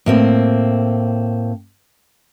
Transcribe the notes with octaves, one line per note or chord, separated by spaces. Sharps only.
A2 A#3 C4